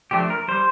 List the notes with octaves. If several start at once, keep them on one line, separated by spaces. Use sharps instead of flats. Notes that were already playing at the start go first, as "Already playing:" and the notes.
F3 A3 D4 G4
A#4
G3 C5